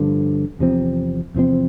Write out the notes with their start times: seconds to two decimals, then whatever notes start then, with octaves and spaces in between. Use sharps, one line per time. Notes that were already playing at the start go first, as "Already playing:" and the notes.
Already playing: G2 D3 F3
0.59 E2 C3 F3 C4
1.34 E2 C3 F3 C4